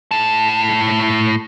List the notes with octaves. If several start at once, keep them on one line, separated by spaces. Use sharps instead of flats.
A2 A5